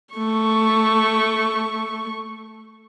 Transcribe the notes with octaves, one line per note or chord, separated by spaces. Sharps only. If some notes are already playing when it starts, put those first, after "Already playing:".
A3 C#6